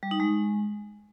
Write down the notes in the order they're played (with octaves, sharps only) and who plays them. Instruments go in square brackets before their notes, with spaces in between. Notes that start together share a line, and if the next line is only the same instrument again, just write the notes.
[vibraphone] G3
D#4
G#3